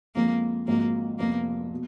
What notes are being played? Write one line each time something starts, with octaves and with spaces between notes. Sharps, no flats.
F2 F3 G#3 A#3
G#1 G#2 F3 A#3
F1 F2 F3 A#3 B3
B2